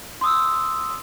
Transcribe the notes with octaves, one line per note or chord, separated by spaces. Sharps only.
C6 D#6 E6